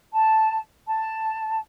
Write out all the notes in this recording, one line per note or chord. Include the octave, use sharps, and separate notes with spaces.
A5
A5